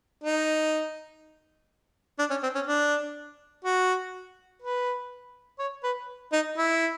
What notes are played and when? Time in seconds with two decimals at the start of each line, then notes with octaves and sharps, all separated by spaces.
0.24 D#4
2.19 D4
2.30 C#4
2.43 C4
2.55 C#4
2.67 D4
3.64 F#4
4.62 B4
5.59 C#5
5.84 B4
6.33 D#4
6.57 E4